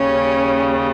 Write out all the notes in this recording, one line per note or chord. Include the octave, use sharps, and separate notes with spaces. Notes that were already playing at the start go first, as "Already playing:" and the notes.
Already playing: D#2 C#3 G3 C#4